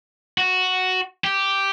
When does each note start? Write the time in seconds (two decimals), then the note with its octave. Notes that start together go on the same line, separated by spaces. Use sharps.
0.38 F#4
1.24 G4